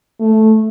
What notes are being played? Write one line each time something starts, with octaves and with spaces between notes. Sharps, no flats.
A3